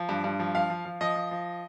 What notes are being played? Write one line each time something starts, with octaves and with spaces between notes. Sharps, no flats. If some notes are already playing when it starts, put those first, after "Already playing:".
Already playing: F3
G2
G2
F3
F3 F5
F3
F3
F3 D#5
F3
F3